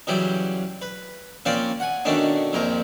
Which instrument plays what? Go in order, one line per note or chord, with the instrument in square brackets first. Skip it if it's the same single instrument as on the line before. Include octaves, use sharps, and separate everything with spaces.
[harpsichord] C#3 E3 F#3 G3 G4
B4
F3 A#3 C4 C#4 D5 F5
F#5 G#5
B2 D3 D#3 A3 C#4 D4
A#1 F2 A#2 F3 A#4